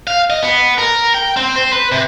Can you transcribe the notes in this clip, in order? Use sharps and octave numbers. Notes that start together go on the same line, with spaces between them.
F5
D#5
B3
A#4
G5
C4
C5
B4
C3